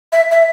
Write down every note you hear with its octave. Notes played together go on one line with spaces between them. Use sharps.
E5
E5